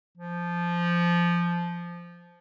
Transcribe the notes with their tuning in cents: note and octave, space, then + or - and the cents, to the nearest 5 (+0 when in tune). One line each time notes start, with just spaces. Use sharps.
F3 -10